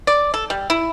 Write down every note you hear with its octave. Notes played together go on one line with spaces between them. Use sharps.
D5
A4
G3
E4